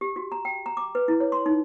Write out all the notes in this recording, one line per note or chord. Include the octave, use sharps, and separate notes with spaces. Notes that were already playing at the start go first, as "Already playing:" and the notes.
G4
F#4
A#5
G5
A#5
D6
B4
E4
C#5
C6
D#4